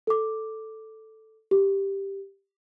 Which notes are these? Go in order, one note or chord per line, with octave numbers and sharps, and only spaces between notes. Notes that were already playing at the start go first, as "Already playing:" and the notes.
A4 D6
G4